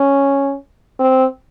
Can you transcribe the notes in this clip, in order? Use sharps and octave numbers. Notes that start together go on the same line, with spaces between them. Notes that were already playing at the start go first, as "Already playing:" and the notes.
Already playing: C#4
C4